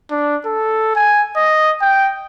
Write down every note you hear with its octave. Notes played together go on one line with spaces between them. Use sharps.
D4
A4
G#5
D#5
G5